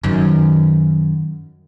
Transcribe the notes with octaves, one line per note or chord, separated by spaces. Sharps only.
F#2 D#3